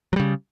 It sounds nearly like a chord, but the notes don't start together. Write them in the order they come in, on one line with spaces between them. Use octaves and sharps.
F#3 G3 C#3